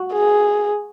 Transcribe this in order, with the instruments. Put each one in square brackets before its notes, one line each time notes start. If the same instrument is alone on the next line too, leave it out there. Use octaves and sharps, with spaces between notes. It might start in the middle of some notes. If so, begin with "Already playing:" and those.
Already playing: [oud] F#4
[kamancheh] G#4